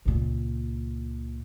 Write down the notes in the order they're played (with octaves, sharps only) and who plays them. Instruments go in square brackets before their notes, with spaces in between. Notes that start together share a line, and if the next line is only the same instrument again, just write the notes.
[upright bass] C#2 A#2